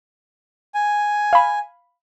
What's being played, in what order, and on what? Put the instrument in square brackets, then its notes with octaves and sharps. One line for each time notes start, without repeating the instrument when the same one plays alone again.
[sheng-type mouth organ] G#5
[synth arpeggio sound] F5 B5